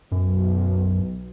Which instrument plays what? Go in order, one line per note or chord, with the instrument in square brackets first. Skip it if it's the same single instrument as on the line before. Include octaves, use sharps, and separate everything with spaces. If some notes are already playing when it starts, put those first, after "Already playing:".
[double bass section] B1 [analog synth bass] F#2